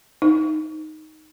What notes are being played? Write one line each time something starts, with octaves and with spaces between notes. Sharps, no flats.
D#4